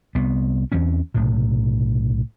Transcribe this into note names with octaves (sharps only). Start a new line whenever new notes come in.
C2 B3
E2 E3 C4 C#4
B1 A2 C3